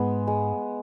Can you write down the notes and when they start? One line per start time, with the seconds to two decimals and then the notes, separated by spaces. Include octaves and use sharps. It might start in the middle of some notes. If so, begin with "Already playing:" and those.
Already playing: G#2 G#3 B3
0.27 G#3